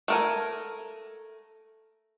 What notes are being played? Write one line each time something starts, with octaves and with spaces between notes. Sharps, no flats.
A3 A#4 G#5